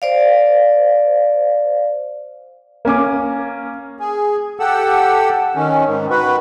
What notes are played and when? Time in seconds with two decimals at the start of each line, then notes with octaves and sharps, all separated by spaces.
0.02 C5 D5 F5
2.85 A#3 C#4 G#5 D6
3.99 G#4
4.60 G4 A4 F#5 E6
5.55 D#3 C#4
5.86 G#2 D#3
6.10 F#4 B4